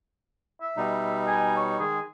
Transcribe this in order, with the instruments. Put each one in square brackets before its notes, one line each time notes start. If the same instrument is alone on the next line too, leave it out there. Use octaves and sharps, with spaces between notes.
[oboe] E5
[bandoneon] B2 G3 D#4
[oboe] G#5
C#5
[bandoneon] D#3 G#3 [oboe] G#4